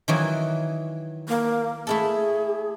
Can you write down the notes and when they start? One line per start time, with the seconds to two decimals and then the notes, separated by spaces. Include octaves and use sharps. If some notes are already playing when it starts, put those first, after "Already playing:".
0.08 D#3 E3 F#3
1.28 A#3
1.87 A3 E4 G#4 A4